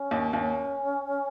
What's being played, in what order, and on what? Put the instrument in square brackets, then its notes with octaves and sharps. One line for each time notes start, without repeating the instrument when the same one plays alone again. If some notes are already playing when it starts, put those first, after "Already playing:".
Already playing: [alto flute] C#4
[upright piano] D#2
[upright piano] D#2 [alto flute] C#4